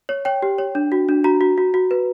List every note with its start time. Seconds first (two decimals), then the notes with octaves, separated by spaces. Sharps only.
0.09 C#5
0.25 C#5 G5
0.42 G4
0.58 C#5
0.75 D4
0.92 F#4
1.09 D4
1.24 F#4 A#5
1.41 F#4
1.58 F#4
1.74 F#4
1.91 B4